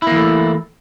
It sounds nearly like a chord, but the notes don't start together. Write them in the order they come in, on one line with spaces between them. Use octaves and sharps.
E4 A#3 E3 A3